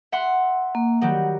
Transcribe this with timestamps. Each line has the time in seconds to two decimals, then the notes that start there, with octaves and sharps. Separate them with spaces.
0.12 E5 F#5 C6
0.75 A#3
1.02 D#3 F#3 G3 F#5